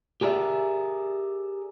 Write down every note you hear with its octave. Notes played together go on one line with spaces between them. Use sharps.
G4 G#4 A#4 D5 E5